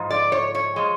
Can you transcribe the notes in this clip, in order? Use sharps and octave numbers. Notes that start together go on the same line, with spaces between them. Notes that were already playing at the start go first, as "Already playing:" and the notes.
Already playing: G#2 F3
D5
C#5
C#5
F3 G#3